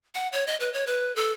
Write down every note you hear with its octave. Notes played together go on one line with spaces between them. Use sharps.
F#5
C#5
D#5
B4
C#5
B4
A4